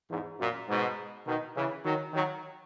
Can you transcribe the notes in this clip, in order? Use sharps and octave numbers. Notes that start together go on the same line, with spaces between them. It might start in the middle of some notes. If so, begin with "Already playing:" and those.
E2 G#2
F#2 A#2
G#2 B2
B2 D#3
C#3 E3
D#3 F#3
D#3 F#3